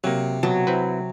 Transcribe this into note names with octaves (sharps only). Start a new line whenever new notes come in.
C3 F#3 A#3
B2 F#3 A5
C4 E4 B4